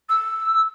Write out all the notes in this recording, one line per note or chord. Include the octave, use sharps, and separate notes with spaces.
E6